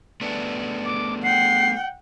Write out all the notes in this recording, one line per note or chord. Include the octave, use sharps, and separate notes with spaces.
A3 B3 D4
D6
F#5 G5 C7